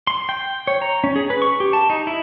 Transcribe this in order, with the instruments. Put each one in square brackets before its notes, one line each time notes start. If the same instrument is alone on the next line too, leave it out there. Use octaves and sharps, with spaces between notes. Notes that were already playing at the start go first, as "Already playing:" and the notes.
[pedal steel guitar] C6
G5
C#5
A#5
C#4
G#4
B4
C#6
G4
A5
D#4
E4